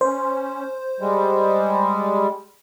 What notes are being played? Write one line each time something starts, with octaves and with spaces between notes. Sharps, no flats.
C#4 C5
G3 G#3